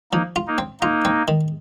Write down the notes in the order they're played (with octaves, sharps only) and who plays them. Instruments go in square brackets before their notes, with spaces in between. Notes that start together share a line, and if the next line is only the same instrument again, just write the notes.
[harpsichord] F3 [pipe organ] A#3 D#4
[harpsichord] F4
[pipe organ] A#3 D#4
[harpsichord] C4
[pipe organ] A#3 D#4 [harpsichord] F4
[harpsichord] C4
D#3